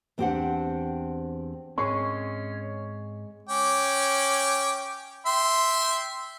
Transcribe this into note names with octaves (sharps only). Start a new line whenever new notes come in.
E2 C4 D4 G4 C5 F#5
G#2 G#3 C4 C#4 C#6 C7
C#4 G5 D6
E5 G5 C6